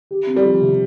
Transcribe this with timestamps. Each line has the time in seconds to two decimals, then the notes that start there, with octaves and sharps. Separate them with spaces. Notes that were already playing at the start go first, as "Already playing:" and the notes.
0.11 G4
0.27 C4
0.36 G3
0.45 F3
0.61 C3